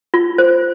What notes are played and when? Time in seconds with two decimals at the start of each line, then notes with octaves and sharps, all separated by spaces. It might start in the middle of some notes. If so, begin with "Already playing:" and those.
0.14 F4
0.38 C5